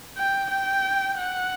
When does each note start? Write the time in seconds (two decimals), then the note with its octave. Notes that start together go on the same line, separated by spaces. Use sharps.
0.17 G5
0.51 G5
1.18 F#5